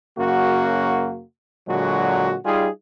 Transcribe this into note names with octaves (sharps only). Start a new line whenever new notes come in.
F#2 C#3 A#3 F#4
A#2 D3 F#3 G#3 F#4
G3 D#4 F4 G#4